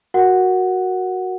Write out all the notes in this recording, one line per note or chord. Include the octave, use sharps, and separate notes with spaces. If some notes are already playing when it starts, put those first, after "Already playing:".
F#4 A#4 F#5